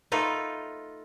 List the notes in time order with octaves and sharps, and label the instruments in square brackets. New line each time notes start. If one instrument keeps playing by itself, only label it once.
[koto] A3 D#4 F4 B4